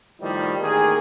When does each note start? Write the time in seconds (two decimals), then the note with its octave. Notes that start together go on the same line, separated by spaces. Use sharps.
0.21 A2 D#3 F3 G3 D#4
0.61 A1 D#3 A#3 G#4